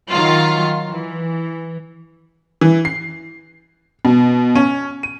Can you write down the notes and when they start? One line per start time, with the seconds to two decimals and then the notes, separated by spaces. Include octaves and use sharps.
0.10 D#3 F#3 F4
0.89 E3
2.61 E3
2.85 C7
4.05 B2
4.55 C#4
5.03 D#7